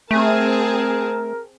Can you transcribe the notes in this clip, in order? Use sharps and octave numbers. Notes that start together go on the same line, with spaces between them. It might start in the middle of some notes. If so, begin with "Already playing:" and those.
A3 C4 G#4 A#4 A5